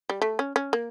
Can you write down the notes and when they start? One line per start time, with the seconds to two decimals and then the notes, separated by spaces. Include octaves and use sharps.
0.10 G3
0.22 A3
0.39 C#4
0.56 C#4
0.73 A#3